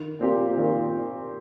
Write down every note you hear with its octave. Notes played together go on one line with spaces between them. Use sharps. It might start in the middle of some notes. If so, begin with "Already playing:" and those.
Already playing: D#3
A#2 C4 G4
A#2 D#3